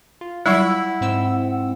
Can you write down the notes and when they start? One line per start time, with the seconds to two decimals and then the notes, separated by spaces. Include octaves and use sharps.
0.21 F4
0.46 F#3 G3 E4 F#5
1.01 G#2 C4 E6